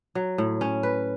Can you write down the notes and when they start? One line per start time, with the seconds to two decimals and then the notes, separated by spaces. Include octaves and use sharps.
0.15 F#3
0.38 A2
0.61 C#4
0.83 B4